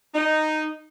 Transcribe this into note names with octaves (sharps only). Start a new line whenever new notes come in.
D#4